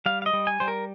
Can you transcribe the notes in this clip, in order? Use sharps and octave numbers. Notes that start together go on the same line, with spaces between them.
G3 F5
F5
D#5
G3
G#5
G3 C5
A#4